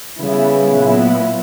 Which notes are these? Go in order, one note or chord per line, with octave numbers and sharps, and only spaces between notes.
C#3 E3 G3 B3 E4
A#2 F#3 B3 E4